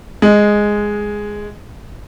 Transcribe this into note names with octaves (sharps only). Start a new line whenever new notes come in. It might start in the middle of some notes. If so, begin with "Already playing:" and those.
G#3